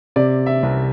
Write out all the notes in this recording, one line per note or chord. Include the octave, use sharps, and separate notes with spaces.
C3 D5
E5
C2